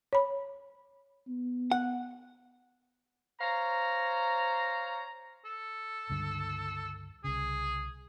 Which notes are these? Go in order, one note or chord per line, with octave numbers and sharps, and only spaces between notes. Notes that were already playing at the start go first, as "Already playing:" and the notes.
C#5 B5
B3
F#5
C5 C#5 F5 A#5
A4
C#2 G2 D3
C2 C#3 G#4